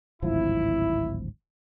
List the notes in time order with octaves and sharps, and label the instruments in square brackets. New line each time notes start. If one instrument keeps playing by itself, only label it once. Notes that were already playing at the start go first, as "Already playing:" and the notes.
[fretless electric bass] D1 G#1 F3 [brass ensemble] E4